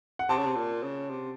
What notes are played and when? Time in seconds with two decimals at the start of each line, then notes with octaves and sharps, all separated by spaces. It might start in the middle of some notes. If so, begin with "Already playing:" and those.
0.19 F#5
0.29 C3 A5
0.37 C#3
0.46 C3
0.56 A#2
0.83 C#3
1.10 C3